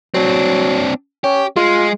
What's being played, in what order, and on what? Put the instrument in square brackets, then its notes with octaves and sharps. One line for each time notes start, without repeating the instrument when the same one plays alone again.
[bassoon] F#3 [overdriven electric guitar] C4 D4
[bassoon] C#4 [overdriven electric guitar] G4
[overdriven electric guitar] G#3 [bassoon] F4